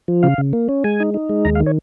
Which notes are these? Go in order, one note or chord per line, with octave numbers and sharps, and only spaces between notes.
F3
C#3 F5
C#3
A#3
C#4
G#3 G#5
D#4
D#4
G#3
D#2 A#5
F5
D#3
C#5